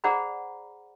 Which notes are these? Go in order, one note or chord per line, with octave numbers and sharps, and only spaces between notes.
G#4 C5 D5 F#5 A#5 B5